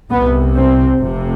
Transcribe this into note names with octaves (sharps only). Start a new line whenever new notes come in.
C2 C3 B3
C4
F1 F2 C3